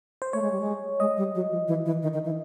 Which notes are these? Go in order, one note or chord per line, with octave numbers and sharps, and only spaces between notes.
C5
A3 C#5
G#3
G3
G#3
G#3 D#5
G3
F#3
F3
E3
E3
D#3
D#3
E3